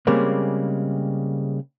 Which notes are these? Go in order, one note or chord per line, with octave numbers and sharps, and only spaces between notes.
C#3 G3 G#3 A#3 C4